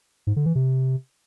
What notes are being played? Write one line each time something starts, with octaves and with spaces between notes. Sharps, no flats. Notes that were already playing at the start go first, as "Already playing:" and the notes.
G#2
D3
E3
C3